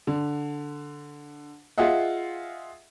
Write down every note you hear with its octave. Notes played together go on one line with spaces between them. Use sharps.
D3
F4 G#4 D#5 E5 F#5